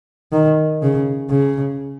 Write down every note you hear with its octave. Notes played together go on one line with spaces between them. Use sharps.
D#3
C#3
C#3